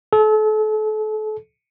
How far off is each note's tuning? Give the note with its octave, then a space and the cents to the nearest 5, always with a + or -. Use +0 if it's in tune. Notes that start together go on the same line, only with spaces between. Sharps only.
A4 -35